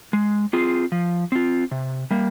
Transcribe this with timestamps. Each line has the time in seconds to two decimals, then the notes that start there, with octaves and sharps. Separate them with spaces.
0.13 G#3
0.53 C4 F4 G#4
0.92 F3
1.32 C4 F4
1.71 C3
2.11 G3 A#3